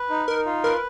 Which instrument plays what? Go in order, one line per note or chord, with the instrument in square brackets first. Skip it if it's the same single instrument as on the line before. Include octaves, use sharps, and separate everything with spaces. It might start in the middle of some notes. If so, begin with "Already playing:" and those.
Already playing: [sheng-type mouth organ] B4
D#4
[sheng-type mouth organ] D#4 [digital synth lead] A#4
[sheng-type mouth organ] F4
[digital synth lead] A#4 [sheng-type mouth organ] B4